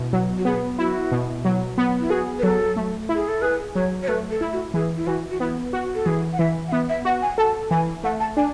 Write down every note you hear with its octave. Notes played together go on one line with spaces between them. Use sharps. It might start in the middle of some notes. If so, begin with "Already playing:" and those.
Already playing: B2 E4
F#3
F#4
B3 G#4
E4 F#4
B2
F#3
B3
E4
F#4 G#4
B4
F#3 A4
A3
E4
G#4
A4
G#4 B4
F#3 C#5
C#5
A3 B4
A4
E4
F#4
E3 G#4
E4
E3 F#4
F#4
B3 E4
F#4
A4
E3 G#4
F#5
E3 E5
F#5
B3 E5
E5
F#4 F#5
G#5
A4 A5
E3 G#5
A3 F#5
A5
D4 G#5